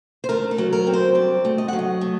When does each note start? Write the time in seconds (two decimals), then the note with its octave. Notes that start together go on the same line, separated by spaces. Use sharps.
0.24 C5
0.29 A3 A#4
0.51 A4
0.58 F#3
0.73 A#4
0.87 C4
0.94 C5
1.15 G2 D5
1.45 A3
1.58 D#5
1.68 F#3 F#5
1.79 D#5
2.01 A3